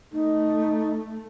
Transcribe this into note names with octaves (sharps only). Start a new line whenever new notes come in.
A3 D#4